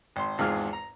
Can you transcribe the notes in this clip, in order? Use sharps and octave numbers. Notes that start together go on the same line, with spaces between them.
G#1 C6
G#1 E2 G#2 F4 G#4 F6
A#5